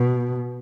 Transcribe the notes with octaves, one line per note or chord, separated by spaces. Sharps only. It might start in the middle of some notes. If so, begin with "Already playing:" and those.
Already playing: B2